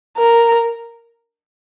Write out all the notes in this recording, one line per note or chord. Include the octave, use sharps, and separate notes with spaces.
A#4